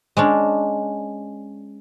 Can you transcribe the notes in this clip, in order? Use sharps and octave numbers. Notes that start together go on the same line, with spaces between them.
G#3 C#4 D4